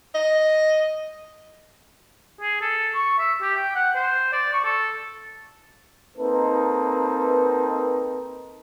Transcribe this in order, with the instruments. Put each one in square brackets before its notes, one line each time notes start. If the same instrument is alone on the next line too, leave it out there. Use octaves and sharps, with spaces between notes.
[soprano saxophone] D#5
[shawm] G#4
A4
C#6
E5
G4
G5
F#5
C5
D5
C#6
A4
[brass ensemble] A#3 C4 D#4 A4 B4